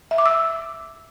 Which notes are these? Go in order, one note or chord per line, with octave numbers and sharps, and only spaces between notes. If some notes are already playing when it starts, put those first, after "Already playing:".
E5
D6
E6